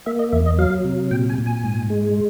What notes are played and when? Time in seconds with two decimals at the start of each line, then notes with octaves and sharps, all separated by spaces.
0.06 A#3 E5
0.19 D#5
0.32 E2 E5
0.46 D#5
0.58 F#3 F5
0.85 C3
1.11 A#2 G5
1.29 G#5
1.38 A#2
1.46 G#5
1.64 G#2
1.90 G#3